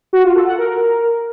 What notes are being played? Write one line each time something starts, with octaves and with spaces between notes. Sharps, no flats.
F#4
F4
A4
F#5
A#4